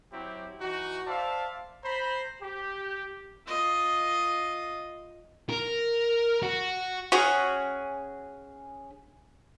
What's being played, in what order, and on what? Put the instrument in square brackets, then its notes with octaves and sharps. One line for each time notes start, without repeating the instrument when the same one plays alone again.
[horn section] F#3 C4 E4 G4
E3 D#4 F#4
C5 D5 E5 F5 A5
C5 A#5 B5
G4
[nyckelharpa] F4 D#5
[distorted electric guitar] A#4
F#4
[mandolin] C#4 G#4 [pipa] F#4